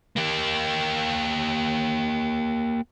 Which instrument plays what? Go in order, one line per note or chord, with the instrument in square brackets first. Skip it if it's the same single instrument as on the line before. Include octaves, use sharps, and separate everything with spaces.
[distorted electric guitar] A#3 G4